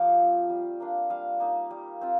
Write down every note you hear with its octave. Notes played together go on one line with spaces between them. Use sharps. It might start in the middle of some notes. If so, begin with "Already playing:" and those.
Already playing: F3 A3 D#4 G4 F5
C4 F4
G3
A#3 D4 F4
G3 F5
A#3 D#4
G3
C4 F4